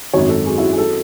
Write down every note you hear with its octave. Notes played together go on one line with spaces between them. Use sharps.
G#1 F#2 D#3 F#3 C#5
A4
G#4
E4
F#4
G#4
F#3 A4